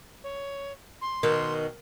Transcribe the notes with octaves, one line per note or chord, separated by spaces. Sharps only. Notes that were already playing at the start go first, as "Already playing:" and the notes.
C#5
C6
B2 D#3 A#4